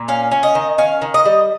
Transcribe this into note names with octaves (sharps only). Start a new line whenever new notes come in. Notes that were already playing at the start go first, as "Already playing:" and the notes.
Already playing: A#2
C#4 F5
C#4
D#5
D#3
C#4 F5
D#3
D#5
G3